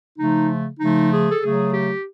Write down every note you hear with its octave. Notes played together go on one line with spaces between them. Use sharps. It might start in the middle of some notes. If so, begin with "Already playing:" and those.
C#3 F3 A3 D#4
C#3 F3 A3 D#4
G#4
A4
C#3 F#3 A3 G#4
G4